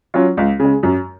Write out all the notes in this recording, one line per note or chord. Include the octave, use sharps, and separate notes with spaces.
F#3 C#4 F4
C#2
C#3 G#3
F#2